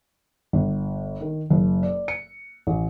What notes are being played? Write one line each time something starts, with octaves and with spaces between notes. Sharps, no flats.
G1
D#3
F#1
D5
C#7
A1